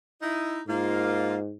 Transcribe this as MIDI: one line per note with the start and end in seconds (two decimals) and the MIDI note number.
0.21 0.60 63
0.21 0.60 64
0.68 1.56 44
0.68 1.36 58
0.68 1.36 65